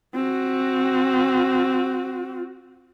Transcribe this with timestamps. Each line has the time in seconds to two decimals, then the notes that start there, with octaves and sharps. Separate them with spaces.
0.14 C4 F#4